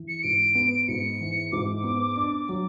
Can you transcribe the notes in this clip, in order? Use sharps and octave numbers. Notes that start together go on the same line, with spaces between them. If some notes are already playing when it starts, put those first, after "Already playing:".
Already playing: E3
C#7
G#2 D7
B3
G#2 C#7
E3
G#2 D6
B3
D4
F#3